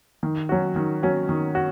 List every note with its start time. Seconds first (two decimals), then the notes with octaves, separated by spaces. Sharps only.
0.23 D#3
0.49 F#3 C#4 F#4
0.76 D#3
1.03 F#3 C#4 F#4
1.29 D#3
1.55 F#4